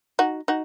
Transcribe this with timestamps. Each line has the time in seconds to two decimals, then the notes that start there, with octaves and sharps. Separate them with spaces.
0.19 D#4 F#4
0.48 D#4 F#4